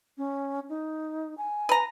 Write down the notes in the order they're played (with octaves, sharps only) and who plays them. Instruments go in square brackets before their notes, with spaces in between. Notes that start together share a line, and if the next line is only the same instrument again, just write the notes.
[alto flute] C#4
D#4
G#5
[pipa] B4 A#5